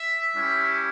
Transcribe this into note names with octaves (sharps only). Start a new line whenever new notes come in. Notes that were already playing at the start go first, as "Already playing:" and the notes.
Already playing: E5
G3 C#4 E4 G4